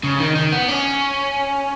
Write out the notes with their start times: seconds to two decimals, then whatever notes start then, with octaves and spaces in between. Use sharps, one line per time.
0.04 C#3
0.20 D#3
0.36 D#3
0.52 B3
0.68 C#4